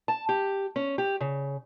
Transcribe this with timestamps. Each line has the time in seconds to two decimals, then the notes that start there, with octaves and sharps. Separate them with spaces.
0.08 A5
0.29 G4
0.76 C#4
0.98 G4
1.21 C#3